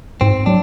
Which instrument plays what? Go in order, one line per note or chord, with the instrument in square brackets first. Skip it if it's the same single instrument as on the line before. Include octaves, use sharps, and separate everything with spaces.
[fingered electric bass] G#2 [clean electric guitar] C4
[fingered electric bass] F#3 [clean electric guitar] D4